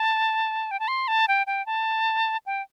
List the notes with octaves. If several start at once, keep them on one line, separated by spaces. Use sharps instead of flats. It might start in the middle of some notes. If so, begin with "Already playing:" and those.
Already playing: A5
G5
A5
C6
A5
G5
G5
A5
G5